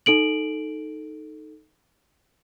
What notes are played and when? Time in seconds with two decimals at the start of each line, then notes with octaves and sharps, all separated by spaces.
0.06 D#4 A4 D7 F#7